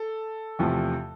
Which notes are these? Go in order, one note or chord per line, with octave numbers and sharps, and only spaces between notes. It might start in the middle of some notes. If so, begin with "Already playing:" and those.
Already playing: A4
E2 C3 F3 A3